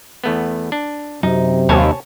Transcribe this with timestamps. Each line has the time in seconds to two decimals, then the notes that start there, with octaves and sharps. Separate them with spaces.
0.24 E2 A3 B3
0.72 D4
1.23 F#2 C3 D#4
1.69 D#2 C#5 G#5 A5